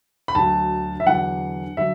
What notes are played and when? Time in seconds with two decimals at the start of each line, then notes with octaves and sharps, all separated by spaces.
0.28 B5
0.35 D2 D3 F#3 A5
1.00 E5
1.06 E2 D3 F#3 F#5
1.77 D3 F#3 E5